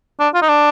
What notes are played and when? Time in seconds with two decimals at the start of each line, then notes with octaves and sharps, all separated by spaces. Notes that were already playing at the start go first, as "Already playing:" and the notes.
0.20 D4
0.34 F4
0.42 D#4
0.49 D4